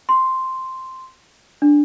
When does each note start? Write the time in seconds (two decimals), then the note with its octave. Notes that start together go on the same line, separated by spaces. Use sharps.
0.09 C6
1.62 D4